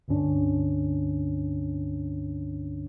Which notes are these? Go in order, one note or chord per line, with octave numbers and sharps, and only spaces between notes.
C#2 G2 D3 C#4 D4